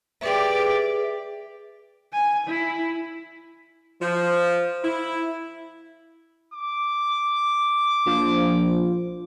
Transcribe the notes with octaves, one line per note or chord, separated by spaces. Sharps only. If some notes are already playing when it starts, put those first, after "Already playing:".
G4 G#4 B4 D5 E5
G#5
E4
F3
E4
D6
A#1 F3